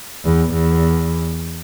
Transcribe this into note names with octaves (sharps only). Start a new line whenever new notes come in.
E2
E2